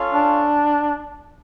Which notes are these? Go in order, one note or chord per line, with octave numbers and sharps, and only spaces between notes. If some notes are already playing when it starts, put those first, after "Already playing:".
Already playing: C#4 F4 A4 C#5 F5
D4